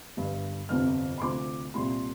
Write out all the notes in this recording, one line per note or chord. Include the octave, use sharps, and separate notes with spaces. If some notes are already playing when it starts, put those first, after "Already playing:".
G1 G2 G3
G1 F2 C3 F6
C6
D2 C3 F3 D6
C2 A#2 G3 C6